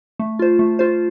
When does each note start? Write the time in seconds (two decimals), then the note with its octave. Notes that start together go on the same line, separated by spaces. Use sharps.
0.19 A3
0.39 F4 C5
0.59 A3
0.79 F4 C5